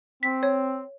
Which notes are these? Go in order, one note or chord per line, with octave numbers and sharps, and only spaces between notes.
C4 B6
C#5